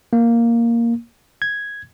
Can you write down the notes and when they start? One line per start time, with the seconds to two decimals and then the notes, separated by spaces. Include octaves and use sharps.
0.13 A#3
1.42 G#6